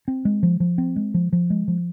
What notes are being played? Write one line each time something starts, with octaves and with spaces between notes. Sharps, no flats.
C4
G#3
F3
F3
C4
G#3
F3
F3
G#3
F3